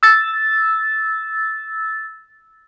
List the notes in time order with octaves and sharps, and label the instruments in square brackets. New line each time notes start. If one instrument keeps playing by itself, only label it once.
[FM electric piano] E6 A6